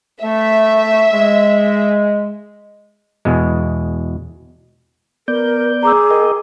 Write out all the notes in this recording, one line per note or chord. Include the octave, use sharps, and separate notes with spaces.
A3 E5
G#3
E2 B2 G#3
B3 A#4 D5 G6
G#4 A#5 D6 E6
A#4 D#5 G5